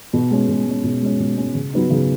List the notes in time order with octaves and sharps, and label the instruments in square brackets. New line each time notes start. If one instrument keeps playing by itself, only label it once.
[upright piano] B2
G#3 C#4
B2
G#3 C#4
B2
G#3 C#4
B2
G#3 C#4
C#3
F#3 B3 D#4
C#3